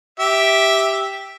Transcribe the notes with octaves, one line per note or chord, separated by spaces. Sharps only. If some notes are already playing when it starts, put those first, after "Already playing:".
G4 E5